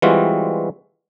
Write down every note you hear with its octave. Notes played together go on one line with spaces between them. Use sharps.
E3 G3 G#3 C4 F4 F#4